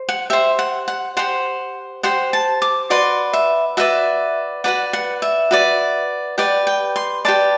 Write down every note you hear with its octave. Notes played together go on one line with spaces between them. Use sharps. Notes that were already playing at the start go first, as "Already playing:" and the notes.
Already playing: C5
F#5
G4 C5 E5
F#5
F#5
G4 C5 F#5
G4 C5 F#5
A5
D6
F#4 B4 D5 C6
E5
F#4 B4 D5 E5
F#4 B4 D5 F#5
F#5
E5
F#4 B4 D5
G4 B4 D5 F#5
G5
C6
G4 B4 D5 A5